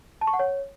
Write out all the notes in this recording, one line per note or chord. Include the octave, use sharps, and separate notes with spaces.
A5
C#6
F#5
C#5